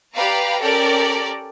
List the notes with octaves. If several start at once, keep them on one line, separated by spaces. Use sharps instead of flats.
G4 B4 D5 F5 A#5
C#4 G4 A4 A#4 D5